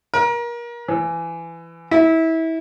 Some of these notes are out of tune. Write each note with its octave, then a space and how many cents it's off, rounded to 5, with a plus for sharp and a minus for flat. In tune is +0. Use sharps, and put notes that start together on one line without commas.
A#4 +30
E3 +20
E4 -25